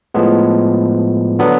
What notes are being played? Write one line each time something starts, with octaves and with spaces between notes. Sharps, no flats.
A2 F3 G#3 B3
D3 F#3 B3 D4